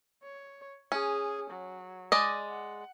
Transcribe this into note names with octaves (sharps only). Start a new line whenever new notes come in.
C#5
C#4 G#4
F#3
G#3 D5 D#5
F#5